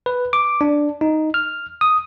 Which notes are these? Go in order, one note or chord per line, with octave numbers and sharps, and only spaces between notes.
B4
D6
D4
D#4
F6
D#6